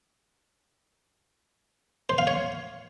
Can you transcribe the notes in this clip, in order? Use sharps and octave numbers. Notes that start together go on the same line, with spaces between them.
C5
F5
C#5